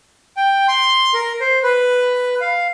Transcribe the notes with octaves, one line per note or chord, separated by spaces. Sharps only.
G5
C6
A#4
C5
B4
F5